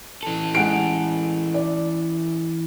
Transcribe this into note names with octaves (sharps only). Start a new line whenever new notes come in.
E3 A4
G#3 F#5 D7
D5